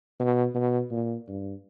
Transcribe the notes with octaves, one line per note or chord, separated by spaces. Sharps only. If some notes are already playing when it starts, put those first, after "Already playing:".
B2
B2
A#2
G2